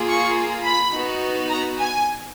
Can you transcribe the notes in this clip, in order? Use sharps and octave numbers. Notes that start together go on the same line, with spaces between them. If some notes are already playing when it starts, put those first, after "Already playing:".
Already playing: A#3 F4 G#4
C#6
B5
B3 D#4 F#4
A#5
G#5